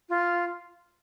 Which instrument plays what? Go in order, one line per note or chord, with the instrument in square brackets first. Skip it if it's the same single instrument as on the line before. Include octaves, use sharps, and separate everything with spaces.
[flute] F4